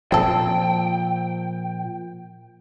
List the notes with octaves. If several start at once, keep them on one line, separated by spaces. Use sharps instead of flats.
A#2 F3 C4 A4 G5